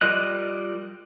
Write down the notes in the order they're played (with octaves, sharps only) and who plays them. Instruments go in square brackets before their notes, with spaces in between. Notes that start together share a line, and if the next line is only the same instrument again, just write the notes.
[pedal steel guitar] G3 F4 A#4 D#5 F#6